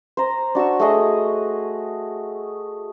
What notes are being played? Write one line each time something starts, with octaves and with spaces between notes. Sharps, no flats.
C5 A#5
D4 F#4 C#6 E6
A3 F#4 G#4 D#5